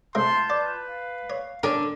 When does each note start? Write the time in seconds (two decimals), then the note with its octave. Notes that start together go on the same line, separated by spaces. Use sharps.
0.15 C3 G#3 F4 E5 A5 C6 G6
0.50 B4 D5
0.85 F5
1.30 C#5
1.63 D3 C#4 G4 A#4